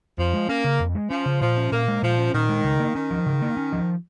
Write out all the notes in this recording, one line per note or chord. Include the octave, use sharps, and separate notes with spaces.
F2 F3
G#3
A#3 C#4
C#3
F2
G#3
F3 C#4
C#3
A#2 F3
C#4
A#2 A#3
G#3
A#2 F3
C#4
A#2 D#3
G#3
C#3
A#3
D#3 C#4
F3
C#3
A#3
C#4
F3